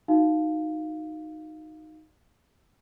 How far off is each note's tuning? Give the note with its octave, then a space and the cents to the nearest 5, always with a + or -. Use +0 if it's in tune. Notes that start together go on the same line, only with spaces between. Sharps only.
D#4 +0 F#4 +0 F5 +0